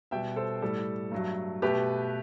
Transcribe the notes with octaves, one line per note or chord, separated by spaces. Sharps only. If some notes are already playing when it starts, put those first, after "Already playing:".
B2 G3 E5 G5
A4 C5
A2 G3 A4
G2 F#3 A3
B2 A3 G4 B4